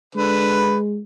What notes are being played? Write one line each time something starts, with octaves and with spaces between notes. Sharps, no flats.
D3 G#3 B4